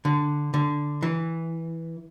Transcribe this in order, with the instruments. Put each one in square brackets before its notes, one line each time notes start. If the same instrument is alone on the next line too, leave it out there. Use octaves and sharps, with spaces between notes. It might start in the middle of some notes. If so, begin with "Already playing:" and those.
[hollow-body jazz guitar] D3
D3
E3